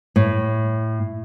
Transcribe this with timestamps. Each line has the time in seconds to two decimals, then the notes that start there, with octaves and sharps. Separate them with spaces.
0.16 A2